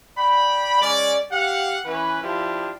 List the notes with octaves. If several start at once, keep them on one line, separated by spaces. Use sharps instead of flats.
D5 G5 B5
G#3 C#4 D5
G4 F5 F#5
E3 C#4 B4
F3 D4 E4 F4 G4